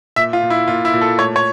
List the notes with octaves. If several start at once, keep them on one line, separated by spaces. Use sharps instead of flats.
A#2 E5
F4
A#2
E4
A#2 F4
E4
A#2
A4
A3 C#5
C#5